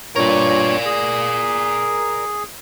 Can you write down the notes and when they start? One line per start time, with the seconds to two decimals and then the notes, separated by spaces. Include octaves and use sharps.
0.16 G2 A#2 A#4 C#5 D5
0.85 G#4